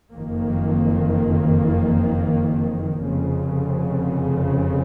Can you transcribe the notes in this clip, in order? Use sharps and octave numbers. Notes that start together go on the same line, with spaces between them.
F#1 F2 D#3 A#3
F1 F2 C#3